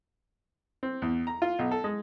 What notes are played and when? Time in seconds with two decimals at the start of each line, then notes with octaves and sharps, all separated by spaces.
0.83 C4
1.02 E2
1.27 A#5
1.42 F4
1.59 B1
1.71 A4
1.84 G#3